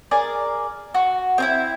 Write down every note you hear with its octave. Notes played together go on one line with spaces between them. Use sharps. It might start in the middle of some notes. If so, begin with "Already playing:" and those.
G#4 A#4 D5
F#4
C4 D#4 E4